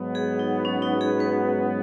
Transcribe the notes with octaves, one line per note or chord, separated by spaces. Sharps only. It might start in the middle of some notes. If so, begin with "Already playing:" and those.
Already playing: G#2 F#3 B3
G#4
D#4
C#4
D#4
G#4
B4